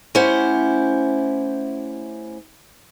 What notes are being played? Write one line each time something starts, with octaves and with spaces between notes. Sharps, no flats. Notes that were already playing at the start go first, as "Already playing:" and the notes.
A3 C#4 E4 G4 C5 F#5